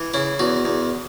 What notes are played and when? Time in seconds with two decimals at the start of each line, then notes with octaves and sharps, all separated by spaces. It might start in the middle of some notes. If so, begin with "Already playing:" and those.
Already playing: E3
0.14 C#3 E4
0.39 E2 F#4
0.65 E2